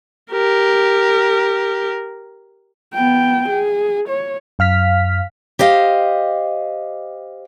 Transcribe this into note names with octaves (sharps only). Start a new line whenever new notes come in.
G4 A#4
B3 G5
G#4
C#5
F#2 F5 F6 B6
G4 C5 D#5 F5